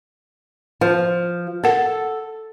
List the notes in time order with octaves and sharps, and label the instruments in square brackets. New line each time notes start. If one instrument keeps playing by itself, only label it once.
[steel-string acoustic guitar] F3
[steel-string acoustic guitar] A4 [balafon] A#4 F#5